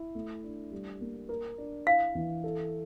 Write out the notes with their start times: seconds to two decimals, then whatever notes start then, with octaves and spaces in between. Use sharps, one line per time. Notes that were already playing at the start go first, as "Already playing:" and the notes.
Already playing: E4
0.15 A3
0.44 D4
0.71 G3
1.01 A#3
1.29 A#4
1.58 D4
1.87 E4 F5
2.15 E3
2.44 A4